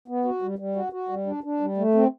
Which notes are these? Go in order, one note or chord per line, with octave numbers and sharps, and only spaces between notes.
B3
F#4
G3
G3
F#4
F#4
G3
D4
D4
G3
A3
C4